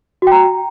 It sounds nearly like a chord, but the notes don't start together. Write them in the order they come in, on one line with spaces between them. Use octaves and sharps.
F#4 G5 A#5